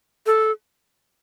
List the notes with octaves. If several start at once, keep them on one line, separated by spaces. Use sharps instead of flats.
A4